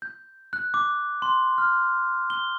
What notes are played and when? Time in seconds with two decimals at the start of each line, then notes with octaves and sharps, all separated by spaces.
0.02 G6
0.53 F#6
0.74 D6
1.22 C6
1.58 F6
2.30 G7